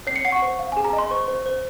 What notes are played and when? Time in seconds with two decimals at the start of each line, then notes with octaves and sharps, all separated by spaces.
0.07 C#5 C7
0.16 C#7
0.25 F#5 C7
0.32 C#6
0.42 C5
0.59 F5
0.72 G#4 G#5
0.85 A#5
0.93 D#5
0.98 C6
1.11 C5 C#6
1.28 C5
1.46 C5